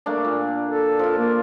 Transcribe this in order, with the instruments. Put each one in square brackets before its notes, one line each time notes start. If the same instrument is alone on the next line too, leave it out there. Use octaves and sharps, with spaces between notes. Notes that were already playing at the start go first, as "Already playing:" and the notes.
[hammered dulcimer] A3 A#3 D4
A#2
[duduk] A4
[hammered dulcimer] F3 F4
[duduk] A#3